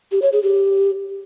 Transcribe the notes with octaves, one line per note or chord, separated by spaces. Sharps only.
G4
C#5
G#4
G4